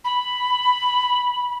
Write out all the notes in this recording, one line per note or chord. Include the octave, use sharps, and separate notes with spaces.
B5